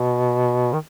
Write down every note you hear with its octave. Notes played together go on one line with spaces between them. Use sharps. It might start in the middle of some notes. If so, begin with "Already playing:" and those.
Already playing: B2
D#3